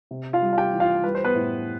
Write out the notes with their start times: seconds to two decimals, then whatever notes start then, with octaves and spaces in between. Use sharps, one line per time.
0.11 C3
0.33 F4 F5
0.42 G3
0.53 F5
0.58 G4 G5
0.73 E3
0.80 F4 F5
1.04 G3 B4
1.15 C5
1.24 B3 B4
1.35 A2